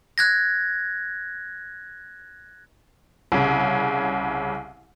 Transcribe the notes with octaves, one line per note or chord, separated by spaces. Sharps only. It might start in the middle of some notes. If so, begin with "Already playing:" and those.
F#6 G#6 A#6
C2 C#3